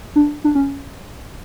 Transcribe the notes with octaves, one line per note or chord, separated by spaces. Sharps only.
D4
D4
C#4